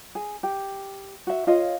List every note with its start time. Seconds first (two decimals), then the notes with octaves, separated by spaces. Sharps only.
0.15 G#4
0.43 G4
1.27 F#4 E5
1.47 F4 C#5 D#5 F5